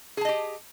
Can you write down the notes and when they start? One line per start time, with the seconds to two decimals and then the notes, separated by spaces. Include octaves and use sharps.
0.17 G#4
0.21 A5
0.25 D#5
0.29 G4